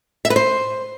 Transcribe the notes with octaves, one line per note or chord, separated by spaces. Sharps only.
E5
B4
C5